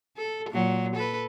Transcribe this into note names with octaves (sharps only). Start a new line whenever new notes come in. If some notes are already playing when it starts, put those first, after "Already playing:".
A4
A#2 F#3
A4 B4